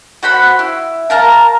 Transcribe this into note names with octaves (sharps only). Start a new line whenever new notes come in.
F#4 C5 F#5 B5
E4
A#4 F5 A5 A#5